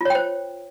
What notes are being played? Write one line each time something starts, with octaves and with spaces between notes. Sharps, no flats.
F4 C5 C#5 G5